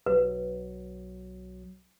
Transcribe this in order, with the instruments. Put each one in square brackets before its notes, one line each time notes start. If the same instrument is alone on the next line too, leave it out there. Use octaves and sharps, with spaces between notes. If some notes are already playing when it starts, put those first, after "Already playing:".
[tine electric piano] B1 F#3 [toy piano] B4